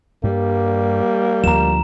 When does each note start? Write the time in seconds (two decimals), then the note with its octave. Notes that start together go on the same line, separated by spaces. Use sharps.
0.24 G2 G3 A#3
1.44 D2 F3 A#5 E7